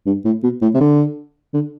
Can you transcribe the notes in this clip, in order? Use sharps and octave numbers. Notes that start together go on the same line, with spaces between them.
G2
A2
B2
A2
C3
D3
D3